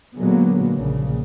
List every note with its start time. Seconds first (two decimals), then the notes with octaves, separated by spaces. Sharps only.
0.16 A#2 D3 F#3 G#3 A#3 B3
0.76 A#1 C#3